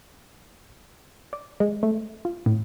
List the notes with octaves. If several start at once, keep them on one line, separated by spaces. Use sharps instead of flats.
D5
G#3
A3
F4
A2